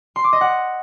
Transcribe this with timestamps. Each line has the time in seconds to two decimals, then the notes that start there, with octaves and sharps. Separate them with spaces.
0.16 C6
0.24 D6
0.33 D#5
0.41 F#5